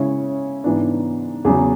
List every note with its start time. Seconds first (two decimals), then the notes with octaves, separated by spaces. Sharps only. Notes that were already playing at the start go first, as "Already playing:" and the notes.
Already playing: C#3 G#3 C#4 E4 C#5
0.64 G#2 E3 B3 D4
1.45 E2 C#3 F#3 G#4